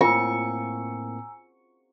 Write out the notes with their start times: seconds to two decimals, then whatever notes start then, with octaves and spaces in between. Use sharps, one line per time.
0.01 A2 A#3 C4 F4 G#5 A#5 C#6 E6